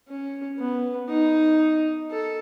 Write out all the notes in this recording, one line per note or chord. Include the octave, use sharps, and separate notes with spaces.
C#4
B3
D#4
A4